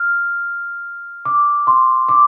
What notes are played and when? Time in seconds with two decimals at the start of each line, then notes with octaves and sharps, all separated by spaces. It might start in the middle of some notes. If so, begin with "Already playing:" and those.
Already playing: F6
1.25 D6
1.67 C6
2.09 D6